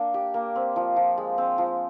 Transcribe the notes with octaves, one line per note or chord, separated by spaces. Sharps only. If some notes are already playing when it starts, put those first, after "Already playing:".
Already playing: A#3 D4
G4
A#3
C4
F3
F3
G#3
C4
F3